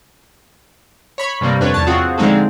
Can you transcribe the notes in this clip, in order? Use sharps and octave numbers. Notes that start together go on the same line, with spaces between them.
C#5 B5 C#6
G2 C3 G3 A#3
F2 D4 B4 C#5
E2 C#5 A5
C4 F4 F#4 G#4
D3 F3 G#3 C4 D#4 A4